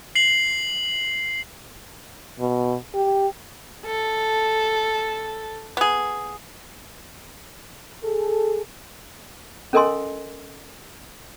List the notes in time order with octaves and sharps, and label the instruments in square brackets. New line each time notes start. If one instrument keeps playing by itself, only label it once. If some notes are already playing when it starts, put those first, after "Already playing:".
[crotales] C7 F#7
[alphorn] B2
G4
[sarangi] A4
[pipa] B3 G#4
[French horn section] G#4 A4
[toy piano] C#4 A4 A#4 D#5 G#5 C6